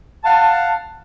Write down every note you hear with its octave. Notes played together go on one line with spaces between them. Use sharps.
F5 F#5 A5